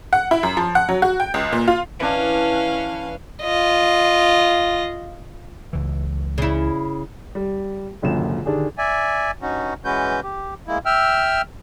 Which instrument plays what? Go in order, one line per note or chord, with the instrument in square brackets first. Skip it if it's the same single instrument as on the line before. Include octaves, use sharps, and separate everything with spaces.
[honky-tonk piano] F#5
E4
F#2
F3
F#5
F#3
F#4
G5
C#2
A#2
F4
[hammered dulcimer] E3 D4 [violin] C#4 F5
[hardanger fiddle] F4 D#5
[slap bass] C#2 E3
[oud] C#3 E4
[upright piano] G3
G#1 C#2 F#2 A#2 D3 E7
D3 D#3 D4 G4 G#4
[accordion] D5 E5 G#5
G2 C#4 D#4 F#4
E3 G#3 C#4 F#4 B4 G6
G4
G#3 A#3 E4
E5 G5 E6 F6